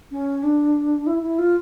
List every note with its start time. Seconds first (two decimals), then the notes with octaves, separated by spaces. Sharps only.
0.12 C#4
0.43 D4
1.07 E4
1.23 E4
1.39 F4